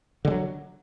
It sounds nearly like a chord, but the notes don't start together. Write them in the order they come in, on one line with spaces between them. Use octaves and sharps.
D3 G#3 F#3